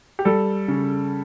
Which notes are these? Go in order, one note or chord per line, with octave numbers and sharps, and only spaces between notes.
G4
G3 A4
C#3